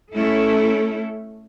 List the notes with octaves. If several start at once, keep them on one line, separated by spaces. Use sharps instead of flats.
A3 C#4 E4 A4